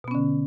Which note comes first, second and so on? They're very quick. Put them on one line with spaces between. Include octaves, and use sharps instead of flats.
B2 B3 C#4 D3